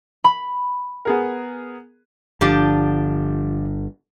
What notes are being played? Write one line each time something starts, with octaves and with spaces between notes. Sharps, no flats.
B5
B3 G#4 A#4
G1 D3 F3 D4 G4